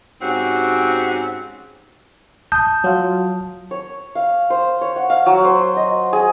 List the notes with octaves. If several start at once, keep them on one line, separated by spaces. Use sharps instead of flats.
G#2 C4 C#4 F#4 G4
A5 D#6 G6
F#3 F4
C#5
F5
C5
C#5
F#5
F5
F#3
C5
D#5
G#4